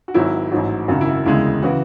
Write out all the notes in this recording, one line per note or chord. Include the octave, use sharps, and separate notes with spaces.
F#4
G#1 G#2 F#3 E4
A1 G#2 F#3
G#1 F#2 C#3 F#4
E4
F#4
E1 D2 C#3 G#3 E4
C#3 E3 F#4